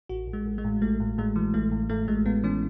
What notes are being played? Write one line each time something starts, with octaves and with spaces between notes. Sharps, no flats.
A1 F#4
A1
G#3
A1
G#3
A2
A1 A3
A2
A2 G#3
E3
A1 A3
A2
A2 A3
A1 G#3
A2 B3
E3 C#4